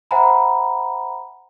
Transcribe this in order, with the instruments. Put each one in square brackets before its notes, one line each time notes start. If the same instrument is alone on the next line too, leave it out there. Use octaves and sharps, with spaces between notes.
[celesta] C5 E5 F#5 G#5 A#5 B5